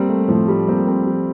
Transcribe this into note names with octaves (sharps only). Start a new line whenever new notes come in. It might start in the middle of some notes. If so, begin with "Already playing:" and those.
Already playing: G3 A#3 C4
A3
A2 F3
G3
G3 A#3 C4
C4
F3